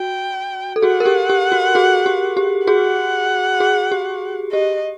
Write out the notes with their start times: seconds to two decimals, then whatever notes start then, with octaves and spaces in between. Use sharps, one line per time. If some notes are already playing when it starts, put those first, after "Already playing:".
Already playing: F#4 G5
0.76 A4
0.82 F#4 G#4 F#5
1.00 A#4
1.05 G4 A4
1.30 G4
1.52 F#4
1.75 F#4 G#4
2.06 G4
2.37 G4
2.67 F#4 G#4 F#5
3.60 F#4 G#4
3.92 G4
4.52 G4 D#5